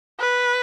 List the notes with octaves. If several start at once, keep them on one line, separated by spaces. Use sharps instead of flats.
B4